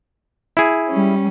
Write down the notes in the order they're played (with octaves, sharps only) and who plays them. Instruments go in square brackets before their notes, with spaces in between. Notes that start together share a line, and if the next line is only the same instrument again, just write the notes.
[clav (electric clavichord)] E4 G#4
[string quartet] G3 C#4